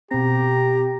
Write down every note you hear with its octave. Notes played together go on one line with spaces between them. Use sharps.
B2 C4 G4 A#5